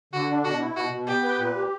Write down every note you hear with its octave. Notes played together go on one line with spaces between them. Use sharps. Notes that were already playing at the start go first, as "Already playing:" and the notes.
D3 F#4
D4
B2 F#4
E4
B2 F#4
B2
B3 G4
B4
A#2
G4